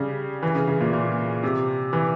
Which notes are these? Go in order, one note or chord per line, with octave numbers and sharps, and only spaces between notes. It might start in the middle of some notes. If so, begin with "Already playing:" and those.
Already playing: C#3 G3
E3
C#3
C#3
A#2
A#2
C3
E3